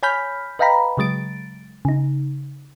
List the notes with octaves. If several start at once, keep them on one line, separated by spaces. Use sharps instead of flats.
C#5 G#5 B5 F6 G6 B6
B4 D#5 F5 G5 A#5 B5
C#3 F#3 G#3 A6 D7
C#3 D#4